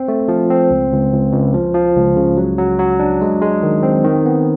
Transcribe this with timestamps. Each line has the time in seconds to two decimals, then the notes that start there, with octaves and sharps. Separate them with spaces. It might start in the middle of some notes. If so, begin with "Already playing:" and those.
Already playing: C4
0.08 A3
0.28 F3
0.50 C4
0.71 C#2
0.92 C#2
1.13 C#2
1.33 C#2
1.54 F3
1.74 F3
1.96 C#2
2.17 C#3
2.37 F#3
2.58 F#3
2.79 F#3
3.00 D4
3.22 G#3
3.42 G#3
3.63 D#3
3.83 C4
4.05 D#3
4.26 B3